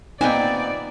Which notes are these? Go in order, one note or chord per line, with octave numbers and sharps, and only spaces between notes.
A#2 B3 C4 D#4 D5 G5 G#5